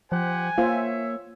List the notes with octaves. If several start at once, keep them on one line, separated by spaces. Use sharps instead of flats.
F3 G4 C5 F#5 G#5
A#3 F4 C5 C#5 E5